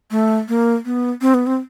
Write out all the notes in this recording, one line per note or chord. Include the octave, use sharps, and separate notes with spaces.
A3
A#3
B3
C4
B3
C4